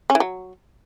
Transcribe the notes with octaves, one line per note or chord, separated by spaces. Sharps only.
C#4
E3
F#3